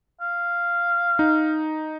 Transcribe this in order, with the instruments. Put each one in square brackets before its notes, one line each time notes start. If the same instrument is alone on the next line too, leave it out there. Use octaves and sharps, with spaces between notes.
[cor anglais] F5
[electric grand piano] D#4